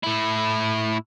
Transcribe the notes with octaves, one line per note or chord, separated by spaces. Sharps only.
A2 E4